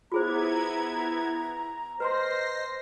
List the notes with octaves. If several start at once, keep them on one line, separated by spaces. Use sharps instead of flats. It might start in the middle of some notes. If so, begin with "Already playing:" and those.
B3 E4 F4 G#4 C5 A#5 G#6
B4 C5 D#5 A#5 C6 A#6 C7